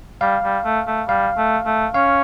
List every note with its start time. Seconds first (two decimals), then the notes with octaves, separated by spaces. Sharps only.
0.21 G3 F5
0.43 G3
0.65 A3
0.87 A3
1.08 G3 F5
1.37 A3
1.66 A3
1.94 C#4 F5